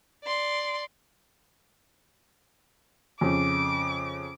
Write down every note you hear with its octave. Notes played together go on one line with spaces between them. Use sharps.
D5 C6
F2 C#3 D6